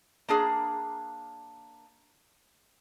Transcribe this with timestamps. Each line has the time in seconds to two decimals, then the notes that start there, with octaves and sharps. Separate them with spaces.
0.29 A#3 D4 G#4 A#5